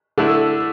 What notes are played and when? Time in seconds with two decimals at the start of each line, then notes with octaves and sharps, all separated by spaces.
0.18 D3 A3 E4